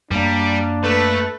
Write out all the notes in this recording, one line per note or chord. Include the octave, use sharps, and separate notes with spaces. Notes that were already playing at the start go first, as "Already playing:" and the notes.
F#2 G3 A#3 D4
A3 A4 B4